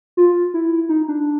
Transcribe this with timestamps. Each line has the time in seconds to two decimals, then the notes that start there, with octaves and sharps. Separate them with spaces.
0.17 F4
0.54 E4
0.89 D#4
1.08 D4